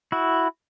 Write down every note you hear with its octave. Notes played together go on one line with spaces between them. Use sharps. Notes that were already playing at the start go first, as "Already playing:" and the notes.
E4 F#4